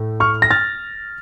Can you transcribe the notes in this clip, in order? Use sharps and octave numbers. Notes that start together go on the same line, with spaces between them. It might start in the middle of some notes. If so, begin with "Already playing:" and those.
Already playing: A2 A3
C#6 F6
A#6
F6 A6